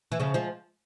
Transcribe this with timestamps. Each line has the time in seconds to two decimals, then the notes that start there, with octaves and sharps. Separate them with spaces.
0.12 E3
0.20 C#3 F3
0.34 F3 G#3